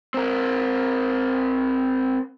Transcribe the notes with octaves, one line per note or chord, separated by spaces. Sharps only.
C4 A#4